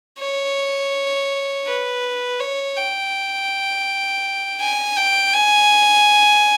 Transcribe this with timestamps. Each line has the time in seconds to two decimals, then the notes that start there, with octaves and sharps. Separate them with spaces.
0.20 C#5
1.67 B4
2.40 C#5
2.77 G5
4.60 G#5
4.97 G5
5.33 G#5